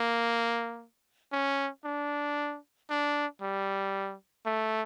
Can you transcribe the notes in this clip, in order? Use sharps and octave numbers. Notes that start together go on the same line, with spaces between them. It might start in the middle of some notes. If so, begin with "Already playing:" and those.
Already playing: A#3
C#4
D4
D4
G3
A3